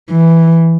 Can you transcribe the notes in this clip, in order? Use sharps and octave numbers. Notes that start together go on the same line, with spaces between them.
E3